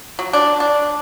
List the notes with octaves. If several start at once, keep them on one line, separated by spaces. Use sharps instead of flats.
F#3
D4
D4